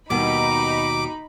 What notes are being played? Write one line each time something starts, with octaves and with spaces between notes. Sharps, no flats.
D#2 B2 G3 D#4 B5 D6